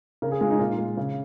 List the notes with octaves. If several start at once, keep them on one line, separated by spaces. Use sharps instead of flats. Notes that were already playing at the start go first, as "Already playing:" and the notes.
C#3 A#4
G#4
G#3 F4
D#4
A#2 F4
G#3
C#3